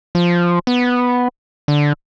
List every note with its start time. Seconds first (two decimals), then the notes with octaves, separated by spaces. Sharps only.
0.15 F3
0.67 B3
1.68 D3